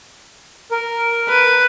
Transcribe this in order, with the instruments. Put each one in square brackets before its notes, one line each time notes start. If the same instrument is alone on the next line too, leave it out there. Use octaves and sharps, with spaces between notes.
[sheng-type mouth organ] A#4
[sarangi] B4